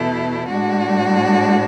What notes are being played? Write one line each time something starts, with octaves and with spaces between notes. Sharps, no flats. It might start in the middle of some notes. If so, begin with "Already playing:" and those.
Already playing: E2 B2 A3 E4
A2 G#3 D4 F#4